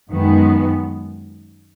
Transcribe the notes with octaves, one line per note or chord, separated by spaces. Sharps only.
F#2 D#3 G#3 B3